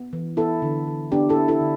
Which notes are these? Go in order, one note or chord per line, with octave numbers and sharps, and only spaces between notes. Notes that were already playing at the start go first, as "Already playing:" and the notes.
Already playing: B3
E3
B3 E4 A4
D3
D3
B3 D4 G4
E4 A4
B3
E4 A4
D3